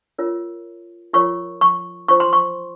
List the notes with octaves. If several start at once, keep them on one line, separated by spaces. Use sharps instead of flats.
F4 A#4 C#5
F4 A#4 C#5 C#6
C#6
F4 C5 C#6
C6
C#6